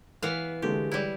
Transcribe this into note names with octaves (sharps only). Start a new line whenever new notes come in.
E3 B3 F5
D3 G#3 A3 G4
G3 E4